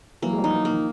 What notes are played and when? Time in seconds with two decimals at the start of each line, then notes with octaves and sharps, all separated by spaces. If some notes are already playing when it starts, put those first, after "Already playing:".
0.22 E3 F#3 A#3
0.33 G#3
0.38 F3 G3
0.44 D#4
0.54 E3 F#3
0.65 D#3 F3 A#3